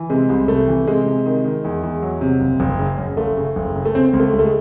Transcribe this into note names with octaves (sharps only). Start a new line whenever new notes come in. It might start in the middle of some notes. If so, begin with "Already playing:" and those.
Already playing: E3
C3 G#3
C2
C3 A3
E3
C3 G#3
C3
D#3
D#3
E2
E2
F#3
C3
F#1
F#1
C#3
F#2
F#1 A3
C#3
F#1
C#3
A3
C#3 C4
C#2 C4
A3
C#2
A3
G#3